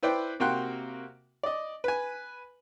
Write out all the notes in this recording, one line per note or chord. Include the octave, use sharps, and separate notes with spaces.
E4 B4 C5 D5 G5
C3 A#3 F#4 G5 C6 F#6
D5 D#5
B4 G#5